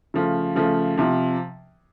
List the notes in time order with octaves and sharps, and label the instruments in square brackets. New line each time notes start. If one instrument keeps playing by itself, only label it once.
[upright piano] C#3 F3 A3
C#3 F3 A3
C3 F3